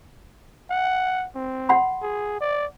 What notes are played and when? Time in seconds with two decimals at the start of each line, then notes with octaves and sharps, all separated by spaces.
0.71 F#5
1.36 C4
1.69 F#5 B5 C6
2.02 G#4
2.41 D5